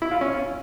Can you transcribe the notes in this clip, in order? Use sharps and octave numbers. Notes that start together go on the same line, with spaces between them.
E4
F4
C#4